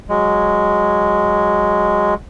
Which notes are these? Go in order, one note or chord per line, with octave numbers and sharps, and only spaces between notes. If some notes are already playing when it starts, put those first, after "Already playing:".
F#3 G#3